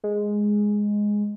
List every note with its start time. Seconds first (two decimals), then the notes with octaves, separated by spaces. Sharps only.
0.03 G#3